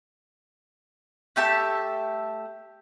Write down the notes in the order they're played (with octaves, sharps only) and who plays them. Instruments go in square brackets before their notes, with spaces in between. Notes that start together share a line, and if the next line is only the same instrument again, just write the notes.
[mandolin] A3 G4 E5 A5